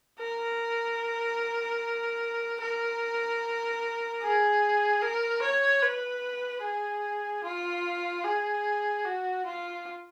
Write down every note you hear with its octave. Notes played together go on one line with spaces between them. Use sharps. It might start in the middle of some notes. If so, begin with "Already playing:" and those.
A#4
A#4
G#4
A#4
C#5
B4
G#4
F4
G#4
F#4
F4